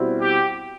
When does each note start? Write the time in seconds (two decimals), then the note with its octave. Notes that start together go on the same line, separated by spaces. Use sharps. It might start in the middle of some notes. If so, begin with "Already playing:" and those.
Already playing: B2 G3 C4 E4
0.21 G4